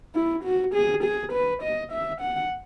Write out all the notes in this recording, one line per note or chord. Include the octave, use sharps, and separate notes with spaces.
E4
F#4
G#4
G#4
B4
D#5
E5
F#5